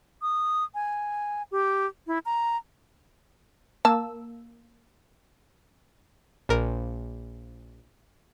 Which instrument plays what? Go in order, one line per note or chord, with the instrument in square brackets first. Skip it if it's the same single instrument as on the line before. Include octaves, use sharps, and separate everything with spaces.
[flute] D#6
G#5
G4
E4
A#5
[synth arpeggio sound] A#3 E6 [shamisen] A5
[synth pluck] A#1 A#4